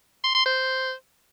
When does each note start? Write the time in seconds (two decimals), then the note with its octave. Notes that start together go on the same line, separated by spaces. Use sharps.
0.24 C6
0.35 C6
0.46 C5